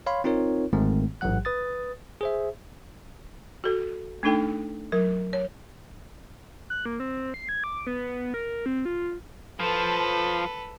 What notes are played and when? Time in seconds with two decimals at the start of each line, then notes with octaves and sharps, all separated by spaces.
0.06 C#5 F5 B5 C6
0.24 C4 D#4 F4 A#4 C#5
0.73 G1 G#2 D#3 G#3 A3 C4
1.21 A1 G#2 F#3 F#5 F#6
1.45 B4 D#6 A6
2.21 G#4 C5 E5
3.64 F#4 A4
4.23 A3 D4 D#4 A4 G5
4.92 F#3 A#4
5.33 C#5
6.70 F#6
6.85 A#3
7.00 C4
7.34 C7
7.49 G#6
7.64 D6
7.87 B3
8.34 A#4
8.66 C4
8.85 F4
9.60 F3 A4 B4